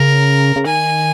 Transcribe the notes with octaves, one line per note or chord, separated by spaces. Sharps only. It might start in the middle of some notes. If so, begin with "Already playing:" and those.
Already playing: C#3 A#4
C#3
D#3 G#5